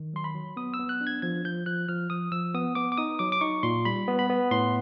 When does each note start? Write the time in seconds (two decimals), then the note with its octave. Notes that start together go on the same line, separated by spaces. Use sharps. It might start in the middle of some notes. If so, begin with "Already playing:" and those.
Already playing: D#3
0.14 F#3 C6
0.24 B5
0.34 F#3
0.57 B3 D#6
0.74 E6
0.79 B3
0.89 F#6
1.01 D4
1.07 G#6
1.22 F3 G#6
1.45 F3 G6
1.66 F3 F#6
1.88 F3 F6
2.10 F3 D#6
2.32 F3 E6
2.54 B3 D#6
2.75 B3 D6
2.92 D6
2.98 D#4 D#6
3.19 F#3 D6
3.32 D6
3.41 D#4 C#6
3.63 A#2 C6
3.85 G3 B5
4.08 B3
4.19 B5
4.29 B3
4.51 A2 C6